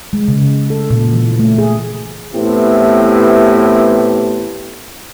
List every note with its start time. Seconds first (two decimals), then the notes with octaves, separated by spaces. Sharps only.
0.13 G#3
0.28 C#3
0.70 A4
0.90 A#2
1.13 E3
1.39 A3
1.58 G#4
2.33 A2 E3 B3 C4 E4 G4